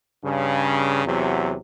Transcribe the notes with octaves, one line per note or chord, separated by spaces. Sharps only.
G2 C#3
E2 C3 F#3